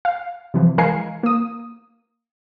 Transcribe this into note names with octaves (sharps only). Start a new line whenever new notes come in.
F5
C3 E3 F3
E3 G#3 A#4 F5 G#5 C7
A#3 D#6